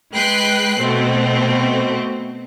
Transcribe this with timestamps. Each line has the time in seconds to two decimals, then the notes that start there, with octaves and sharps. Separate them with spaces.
0.14 G#3 B4 G5 F#6 C7
0.78 B2 A3 C4